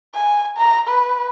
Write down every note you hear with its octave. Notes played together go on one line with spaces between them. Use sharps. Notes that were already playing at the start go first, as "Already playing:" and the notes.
G#5
A#5
B4